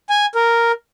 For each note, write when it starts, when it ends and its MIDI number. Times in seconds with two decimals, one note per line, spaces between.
0.09 0.26 80
0.35 0.72 70